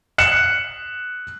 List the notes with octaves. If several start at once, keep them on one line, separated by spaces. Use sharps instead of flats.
F#6 C#7 E7